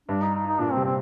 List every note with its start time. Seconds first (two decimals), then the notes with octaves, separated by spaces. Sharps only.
0.08 G2 D4
0.22 D#4
0.34 D#4
0.47 D#4
0.59 A#2 D4
0.72 C4
0.77 C3
0.84 C4